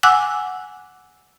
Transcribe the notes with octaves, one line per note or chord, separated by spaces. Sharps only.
F#5 G#5 D6 E6 F#6